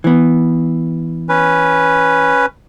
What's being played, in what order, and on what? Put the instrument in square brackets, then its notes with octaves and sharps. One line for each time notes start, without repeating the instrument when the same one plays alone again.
[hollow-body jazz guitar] E3 B3
[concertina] C#4 B4